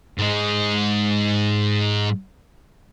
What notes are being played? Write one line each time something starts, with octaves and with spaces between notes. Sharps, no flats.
G#2 G#3